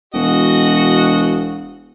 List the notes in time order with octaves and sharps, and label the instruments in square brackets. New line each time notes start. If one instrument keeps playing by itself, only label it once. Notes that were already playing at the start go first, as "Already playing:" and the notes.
[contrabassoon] E1 [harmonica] F#4 D#5